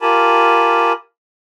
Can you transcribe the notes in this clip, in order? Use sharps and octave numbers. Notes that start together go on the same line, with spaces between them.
F4 G4 A#4 G#5 A5 B5